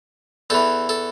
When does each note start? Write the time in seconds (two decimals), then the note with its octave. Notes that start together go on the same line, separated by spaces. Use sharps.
0.50 E2 E3 A4
0.89 A4